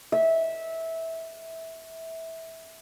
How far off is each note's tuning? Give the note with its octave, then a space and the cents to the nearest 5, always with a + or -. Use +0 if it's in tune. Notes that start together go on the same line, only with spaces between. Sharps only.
E5 -15